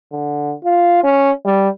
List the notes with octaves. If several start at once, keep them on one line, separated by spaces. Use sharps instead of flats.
D3
F4
C#4
G3